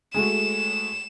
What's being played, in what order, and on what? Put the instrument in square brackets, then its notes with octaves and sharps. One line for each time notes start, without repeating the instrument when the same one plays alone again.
[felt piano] G#3 A3 F#4 [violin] E7